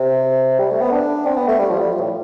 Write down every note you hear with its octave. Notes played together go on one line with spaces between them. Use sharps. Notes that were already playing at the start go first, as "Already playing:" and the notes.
Already playing: C3
G3
A3
B3
D4
C4
B3
A3
G3
F3
G3
F3
A2